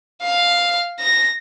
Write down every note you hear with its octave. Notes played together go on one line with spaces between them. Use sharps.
F5
A#6